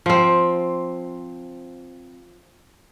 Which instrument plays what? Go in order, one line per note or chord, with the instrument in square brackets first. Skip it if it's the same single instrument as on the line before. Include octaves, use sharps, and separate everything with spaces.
[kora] F3 C4